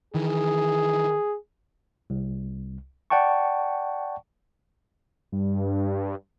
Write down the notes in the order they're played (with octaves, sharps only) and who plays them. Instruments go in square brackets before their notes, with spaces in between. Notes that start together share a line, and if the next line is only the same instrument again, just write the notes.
[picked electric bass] D#3 E3 [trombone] G#4
[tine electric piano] C2
D5 F#5 G5 A5 C#6
[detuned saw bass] G2